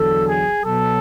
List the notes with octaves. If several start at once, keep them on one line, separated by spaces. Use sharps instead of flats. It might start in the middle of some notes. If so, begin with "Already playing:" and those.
Already playing: E2 D3 F#3 A4
G#4
B2 F#3 A4